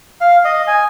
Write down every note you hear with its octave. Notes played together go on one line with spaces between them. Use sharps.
F5
D#5
G#5